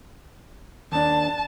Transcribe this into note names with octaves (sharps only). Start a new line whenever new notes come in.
D#2 D4 A5